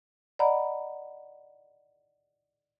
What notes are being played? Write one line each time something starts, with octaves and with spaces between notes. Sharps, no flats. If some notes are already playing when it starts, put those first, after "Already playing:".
D5 D#5 F#5 A#5 B5